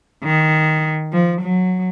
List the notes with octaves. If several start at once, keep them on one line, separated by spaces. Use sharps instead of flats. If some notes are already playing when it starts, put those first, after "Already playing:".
D#3
F3
F#3